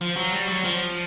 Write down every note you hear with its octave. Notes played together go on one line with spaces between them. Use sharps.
F3
F#3
G3
F#3
F3